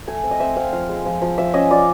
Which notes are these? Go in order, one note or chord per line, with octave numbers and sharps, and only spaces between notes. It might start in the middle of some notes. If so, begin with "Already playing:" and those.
A3 G#5
C4
D#5
C4 E5
C4 F5
F3 F5
G#3
F3
F3
F3 E5
C#4 D#5
F4 D5